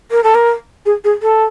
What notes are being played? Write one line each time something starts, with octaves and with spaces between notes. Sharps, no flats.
A#4
A4
A#4
G#4
G#4
A4